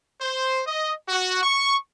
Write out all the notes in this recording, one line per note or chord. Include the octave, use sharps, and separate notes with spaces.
C5
D#5
F#4
C#6